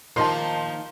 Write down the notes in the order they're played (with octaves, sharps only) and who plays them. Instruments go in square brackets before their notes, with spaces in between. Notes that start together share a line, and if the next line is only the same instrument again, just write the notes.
[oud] D#3 A#3 [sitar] F3 D#4 F4 [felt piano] A5 C6